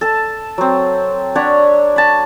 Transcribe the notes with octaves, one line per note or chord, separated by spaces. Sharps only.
A4 A5
F#3 C4
D4 C#5 F#5 B5
A5 B5